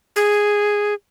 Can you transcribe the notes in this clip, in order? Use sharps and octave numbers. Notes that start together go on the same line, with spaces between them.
G#4